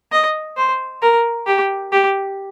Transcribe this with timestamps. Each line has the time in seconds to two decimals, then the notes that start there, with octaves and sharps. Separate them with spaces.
0.12 D#5
0.57 C5
1.02 A#4
1.47 G4
1.92 G4